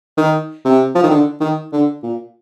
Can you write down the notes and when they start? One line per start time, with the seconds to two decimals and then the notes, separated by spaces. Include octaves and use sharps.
0.18 D#3
0.65 C3
0.95 F3
1.03 D#3
1.10 D3
1.41 D#3
1.72 D3
2.03 A#2